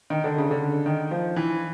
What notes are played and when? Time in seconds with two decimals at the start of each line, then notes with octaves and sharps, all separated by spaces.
0.10 D#3
0.24 D3
0.38 C#3
0.51 D3
0.86 D#3
1.11 F3
1.36 E3